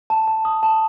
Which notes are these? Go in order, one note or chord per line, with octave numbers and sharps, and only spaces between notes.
A5
A5
D#6
A5